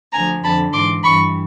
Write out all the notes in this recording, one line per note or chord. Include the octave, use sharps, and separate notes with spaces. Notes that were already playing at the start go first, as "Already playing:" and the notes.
D2 D3 F3 G#5 A#5
F2 D3 F3 A5 B5
G#2 E3 C6 D6
G2 E3 B5 C#6